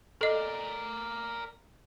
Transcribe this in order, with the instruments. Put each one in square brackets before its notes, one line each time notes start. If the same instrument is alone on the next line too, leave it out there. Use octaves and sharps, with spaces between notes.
[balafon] A4 D#5 [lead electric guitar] A#4 D5